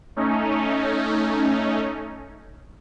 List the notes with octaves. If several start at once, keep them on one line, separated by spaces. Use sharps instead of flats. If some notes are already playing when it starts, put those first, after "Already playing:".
A3 C#4 D#4